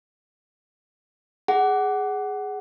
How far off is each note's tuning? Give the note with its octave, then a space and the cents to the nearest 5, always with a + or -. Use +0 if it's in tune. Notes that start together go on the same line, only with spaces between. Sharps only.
G#4 +0 F#5 +20